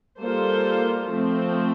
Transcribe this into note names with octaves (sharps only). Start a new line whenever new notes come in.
G3 A#3 F4 A4 C5
F3 A3 C4